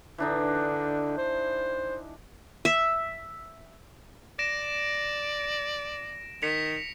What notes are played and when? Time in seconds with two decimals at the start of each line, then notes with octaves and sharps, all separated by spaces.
0.18 D3 E3 D4 D#4
1.18 C5
2.65 E5
4.39 D5 A#6 D7 E7
6.42 D#3 B6 C#7 F7